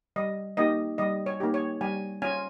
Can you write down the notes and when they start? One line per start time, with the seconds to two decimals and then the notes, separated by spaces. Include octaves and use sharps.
0.16 G3 D#5
0.57 A#3 D#4 G4 D#5
0.98 G3 D#5
1.26 C#5
1.40 A#3 D#4 G4
1.54 C#5
1.81 G3 G#5
2.22 C#4 F4 G#5